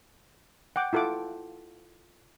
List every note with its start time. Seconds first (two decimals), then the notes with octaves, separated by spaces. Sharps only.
0.76 F#5 G5 D6
0.93 E4 F4 A4 F#5 D6